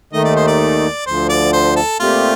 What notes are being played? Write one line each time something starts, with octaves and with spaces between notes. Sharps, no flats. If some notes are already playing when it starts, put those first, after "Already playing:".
D#2 D#3 A3 D#4 D#5
D5
C5
D5
D2 D3 F3 C5
D5
C5
A4
A#2 A3 C4 F4 G4